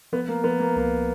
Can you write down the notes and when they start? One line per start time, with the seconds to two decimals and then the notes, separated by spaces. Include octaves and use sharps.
0.13 F3 B3
0.28 A#3
0.44 F3 B3
0.60 A#3
0.76 C2 A#3